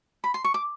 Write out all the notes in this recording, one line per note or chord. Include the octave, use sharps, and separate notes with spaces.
B5
C6
C#6
D6